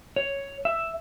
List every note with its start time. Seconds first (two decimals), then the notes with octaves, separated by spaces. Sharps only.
0.16 C#5
0.65 E5